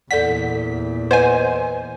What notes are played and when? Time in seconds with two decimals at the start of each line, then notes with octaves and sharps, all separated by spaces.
0.11 E2 A#2 A4 D5 F#5 B6
1.11 B4 C5 D#5 F#5 G#5